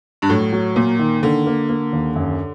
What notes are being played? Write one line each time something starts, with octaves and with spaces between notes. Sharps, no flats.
G2
A2 F#3
F#3
A#2 A#3
D#3
D3 A#3
A#3
A#3
D#2
F#2